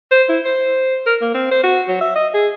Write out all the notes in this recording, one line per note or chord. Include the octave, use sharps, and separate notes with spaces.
C5
E4
C5
A#4
A#3
C4
C5
F#4
F#3
E5
D#5
G#4